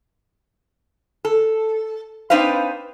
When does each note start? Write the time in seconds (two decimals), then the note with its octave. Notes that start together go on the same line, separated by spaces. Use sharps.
1.25 A4
2.30 C4 D4 D#4 B4 C5 F5